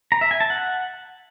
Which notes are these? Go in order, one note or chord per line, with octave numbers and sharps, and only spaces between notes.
A#5
E5
G#5
A5
F#5